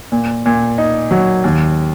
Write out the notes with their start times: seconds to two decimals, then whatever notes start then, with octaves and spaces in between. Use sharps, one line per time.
0.12 A#2
0.46 A#2
0.78 D#4
1.11 F#3
1.44 D#2